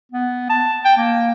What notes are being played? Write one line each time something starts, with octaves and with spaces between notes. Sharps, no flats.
B3
A5
G5
A#3